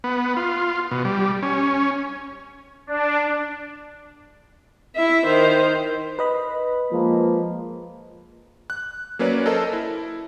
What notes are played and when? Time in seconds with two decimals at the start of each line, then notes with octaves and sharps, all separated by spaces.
0.04 B3
0.37 F4
0.91 B2
1.05 G3
1.43 C#4
2.87 D4
4.96 E4 E5
5.26 D#3 C5
6.19 B4 D#5 B5
6.93 F3 G#3 A#3
8.70 F#6
9.19 F#3 A#3 C#4 B4 C#5 D5
9.46 A4 A#4 C5 D#5 A5
9.73 E4